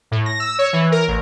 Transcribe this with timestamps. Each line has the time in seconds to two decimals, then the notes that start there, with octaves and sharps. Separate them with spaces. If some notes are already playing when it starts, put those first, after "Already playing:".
0.11 A2
0.26 A#6
0.40 E6
0.58 C#5
0.73 E3
0.92 A#4
1.08 A1